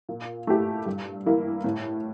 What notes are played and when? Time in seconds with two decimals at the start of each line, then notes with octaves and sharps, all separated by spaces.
0.09 A#2
0.47 A3 E4 G4
0.86 G2
1.26 E3 G3 A#3 E4
1.64 A2